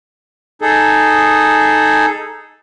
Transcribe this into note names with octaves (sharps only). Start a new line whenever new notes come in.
D#4 G#4 A4